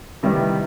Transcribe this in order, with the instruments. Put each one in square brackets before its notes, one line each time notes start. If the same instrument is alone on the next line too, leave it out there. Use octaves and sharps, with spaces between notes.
[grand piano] C3 D#3 G3 B3 E4